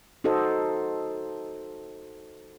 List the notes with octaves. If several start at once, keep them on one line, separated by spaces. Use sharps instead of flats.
D#4 F#4 A4 C5 D#5